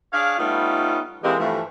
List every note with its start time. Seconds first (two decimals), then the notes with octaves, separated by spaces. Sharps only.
0.12 D4 G#4 C#5 F5
0.38 G3 A3 B3 C#4 D#4 F4
1.23 C3 E3 G#3 A#3 C4 G4
1.39 G2 E3 F3 A3